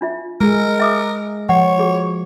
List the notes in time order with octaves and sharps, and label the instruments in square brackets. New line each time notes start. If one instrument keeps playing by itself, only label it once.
[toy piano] D4 F4 E5
[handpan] G#3 G#4 [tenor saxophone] A#4
[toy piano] E5 D6 D#6
[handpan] F3 [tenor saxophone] C#5 [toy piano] F#5
[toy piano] F#4 G#4